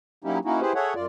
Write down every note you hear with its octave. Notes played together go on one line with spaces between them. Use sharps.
F#3 A#3 C#4 D#4 E4 G4
A#3 C#4 D#4 E4 F#4
E4 G4 G#4 B4 C5
G#4 A4 C#5 E5 F#5
F#2 F4 D5